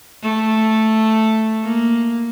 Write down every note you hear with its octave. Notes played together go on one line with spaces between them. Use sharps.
A3
A#3